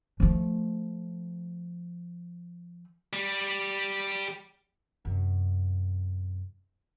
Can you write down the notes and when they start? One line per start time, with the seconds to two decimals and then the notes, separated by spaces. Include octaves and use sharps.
0.20 F3 A3
3.13 G3
5.05 F#2 C3